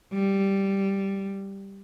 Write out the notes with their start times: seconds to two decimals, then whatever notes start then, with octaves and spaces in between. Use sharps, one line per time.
0.13 G3